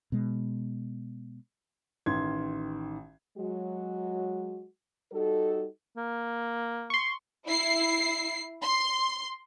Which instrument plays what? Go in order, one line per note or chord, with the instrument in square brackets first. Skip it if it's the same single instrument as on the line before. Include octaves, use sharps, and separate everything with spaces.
[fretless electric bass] B2 G#3
[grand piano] A1 D#3 C6 G#6
[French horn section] F#3 G#3 F#4
G3 D#4 F#4 A4
[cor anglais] A#3
[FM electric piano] C6 C#6
[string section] E4 C7
C6